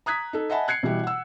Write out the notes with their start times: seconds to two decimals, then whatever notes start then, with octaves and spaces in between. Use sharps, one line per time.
0.06 A#5 D#6 F#6 G#6 B6
0.33 D#4 A4
0.50 D#5 E5 F#5 G#5 A5 B5
0.68 F#6 G#6 C7 C#7
0.83 B2 E3 G3 E4 G4
1.04 F#5 E6